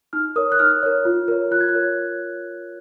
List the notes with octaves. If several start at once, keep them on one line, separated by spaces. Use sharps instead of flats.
D#4 F6
A#4 C#5 D#6
F#6
D#4 F6
A#4 C#5
F4
A#4 C#5
F4 F#6
G#6
F#6
A#4 C#5